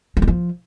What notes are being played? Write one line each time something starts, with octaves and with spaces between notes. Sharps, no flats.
F3
G3
F3